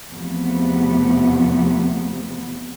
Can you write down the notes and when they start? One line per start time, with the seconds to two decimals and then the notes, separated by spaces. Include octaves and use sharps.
0.11 E2 C3 F3 A3 B3